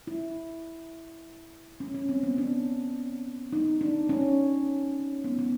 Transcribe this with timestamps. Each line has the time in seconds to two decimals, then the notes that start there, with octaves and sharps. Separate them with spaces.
0.07 E4
1.80 C#4
1.95 C#4
2.09 C4
2.23 B3
2.38 D4
3.53 D#4
3.81 D4
4.09 C#4
5.24 B3
5.39 B3